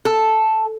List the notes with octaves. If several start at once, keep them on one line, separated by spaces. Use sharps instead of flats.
A4